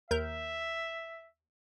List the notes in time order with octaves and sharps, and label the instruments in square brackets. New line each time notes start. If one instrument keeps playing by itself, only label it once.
[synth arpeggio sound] D#2 A#4 G6 [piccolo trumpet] E5